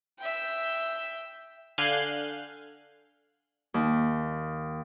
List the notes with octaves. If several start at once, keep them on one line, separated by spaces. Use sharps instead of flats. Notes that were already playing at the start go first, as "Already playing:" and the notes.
E5 G5
D3 F5 G#5 F#6 G6
D#2